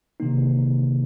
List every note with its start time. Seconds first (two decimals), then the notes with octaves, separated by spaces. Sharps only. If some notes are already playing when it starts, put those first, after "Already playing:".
0.20 C3 D#3 A#3 D#4